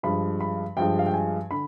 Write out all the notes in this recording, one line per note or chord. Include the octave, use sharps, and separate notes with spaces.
G2 F3 G#3 B5
B5
G2 F3 G#3 G5
F5
G5
G#5
D3 B5